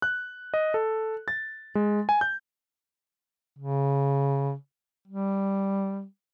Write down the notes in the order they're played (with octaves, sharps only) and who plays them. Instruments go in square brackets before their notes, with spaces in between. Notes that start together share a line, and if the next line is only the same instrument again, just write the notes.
[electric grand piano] F#6
D#5
A4
A6
G#3
G#5
G6
[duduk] C#3
G3